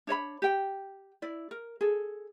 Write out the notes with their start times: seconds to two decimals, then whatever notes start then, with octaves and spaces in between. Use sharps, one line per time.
0.07 D4 C#5 D#5 B5
0.42 G4 G5
1.22 E4 D5
1.51 A#4
1.81 G#4 A4